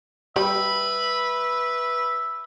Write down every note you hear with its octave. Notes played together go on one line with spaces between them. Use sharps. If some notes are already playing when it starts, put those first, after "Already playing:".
G3 B4 E5 B5